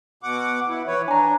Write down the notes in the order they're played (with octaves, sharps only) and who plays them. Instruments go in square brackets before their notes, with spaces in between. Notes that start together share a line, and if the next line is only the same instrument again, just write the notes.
[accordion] B2 F#5 D6
E4
E3 B4 C#5
[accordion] D4 [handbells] G#5 A#5